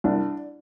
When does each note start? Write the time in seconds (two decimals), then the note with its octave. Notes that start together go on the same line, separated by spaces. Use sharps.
0.04 C2 D4